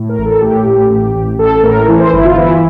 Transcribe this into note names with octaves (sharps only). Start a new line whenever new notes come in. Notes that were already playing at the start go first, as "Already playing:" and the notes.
Already playing: A2
A#4
A1
A4
A2 G4
A1
A1
A1
A1 A4
A2 A#4
E3
C5
G1 E4
F4
E3 E4